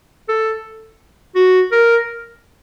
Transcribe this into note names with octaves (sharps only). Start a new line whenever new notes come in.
A4
F#4
A#4